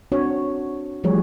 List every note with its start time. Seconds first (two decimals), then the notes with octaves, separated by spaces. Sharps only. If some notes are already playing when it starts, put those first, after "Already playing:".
0.12 C4 D4 F#4 C#5
1.04 E3 F3 G3 A3 G#4 C#5